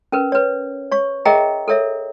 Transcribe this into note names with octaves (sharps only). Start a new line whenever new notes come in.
C#4 A#4 B4
B4 C#5
C#5 C#6
G#4 A#4 D#5 E5 G5 A#5
A4 A#4 C#5 E5